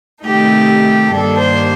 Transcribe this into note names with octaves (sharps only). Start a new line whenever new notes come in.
C3 D#3 A3 D#4 G4
G2 D#3 G3 A#3 D4 A4
C5